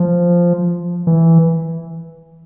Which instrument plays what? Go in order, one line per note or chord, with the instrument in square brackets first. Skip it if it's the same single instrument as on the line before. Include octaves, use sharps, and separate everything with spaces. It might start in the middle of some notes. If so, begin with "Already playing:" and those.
Already playing: [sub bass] F3
E3